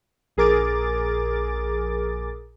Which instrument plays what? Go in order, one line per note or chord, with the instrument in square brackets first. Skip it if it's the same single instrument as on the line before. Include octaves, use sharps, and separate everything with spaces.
[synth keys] A#1 G#4 A#4 D6 A6